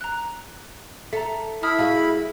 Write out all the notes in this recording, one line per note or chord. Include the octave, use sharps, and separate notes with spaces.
A#5 F#6
A4 E5 A#5
E4 A5 B5 D#6 F6
G#3 F#4 G#4 F5